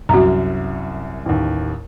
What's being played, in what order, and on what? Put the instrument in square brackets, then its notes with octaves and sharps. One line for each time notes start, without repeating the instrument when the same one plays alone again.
[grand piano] C2 F#2 [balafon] F#4 A#5
[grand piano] A1 D#2